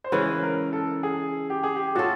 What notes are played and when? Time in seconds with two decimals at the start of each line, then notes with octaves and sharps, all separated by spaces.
0.04 C5
0.12 C#3 E3 G#3 B4
0.43 A#4
0.73 A4
1.03 G#4
1.50 G4
1.63 G#4
1.76 G4
1.95 A3 C#4 F4 F#4 A4